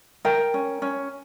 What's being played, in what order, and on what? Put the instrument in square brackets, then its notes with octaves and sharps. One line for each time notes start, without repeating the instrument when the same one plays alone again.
[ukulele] A#4 G5
C#4
C#4